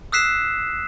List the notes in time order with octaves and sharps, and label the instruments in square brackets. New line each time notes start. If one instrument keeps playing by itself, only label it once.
[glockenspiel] D#6 E6 F#6 B6 C7 E7